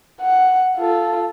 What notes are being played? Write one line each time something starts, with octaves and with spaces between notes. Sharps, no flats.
F#5
F4 A4